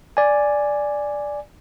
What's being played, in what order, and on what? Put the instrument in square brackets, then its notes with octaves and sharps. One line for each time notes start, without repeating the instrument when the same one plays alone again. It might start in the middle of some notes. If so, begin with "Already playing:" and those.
[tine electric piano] D5 G#5